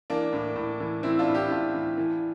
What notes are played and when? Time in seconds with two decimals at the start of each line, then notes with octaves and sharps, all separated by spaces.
0.10 E3 A#3 D4
0.33 A2
0.56 A2
0.80 E3
1.03 E3 C4 E4
1.19 D4 F4
1.27 A2
1.34 E4 G4
1.50 A2 D4 F4
1.74 E3
1.98 E3